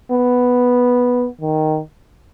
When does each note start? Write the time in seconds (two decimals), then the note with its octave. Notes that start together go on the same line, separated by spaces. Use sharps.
0.12 B3
1.41 D#3